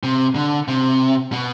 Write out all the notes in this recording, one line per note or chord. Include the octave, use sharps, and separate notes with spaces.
C3
D3
C3
B2